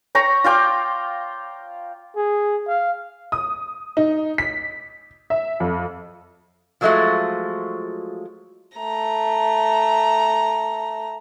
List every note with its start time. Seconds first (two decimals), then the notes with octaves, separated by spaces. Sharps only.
0.15 C#5 G5 A#5 C#6
0.44 F4 F5 G5 D6
2.16 G#4
2.68 F5
3.32 D#6
3.97 D#4
4.38 B6
5.30 E5
5.60 F2
6.81 F3 F#3 G#3 A3 F4 F#4
8.77 A3 A#5